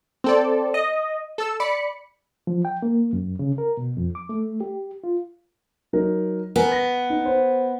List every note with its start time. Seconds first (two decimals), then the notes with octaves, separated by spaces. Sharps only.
0.24 C4 A4 D5
0.74 D#5
1.38 A4 E6
1.60 D5 B5 C#7
2.47 F3
2.65 G5
2.82 A#3
3.13 F#2
3.39 C#3
3.58 A#4
3.77 B2
3.97 F2
4.15 D6
4.29 A3
4.61 G4
5.04 F4
5.93 F#3 D#4 A#4
6.56 B3 A#4 G#5
6.72 A#6
7.10 D#4
7.25 C5